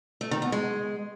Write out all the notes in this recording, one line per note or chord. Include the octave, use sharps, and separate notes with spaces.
A3
D#3
B3
G#3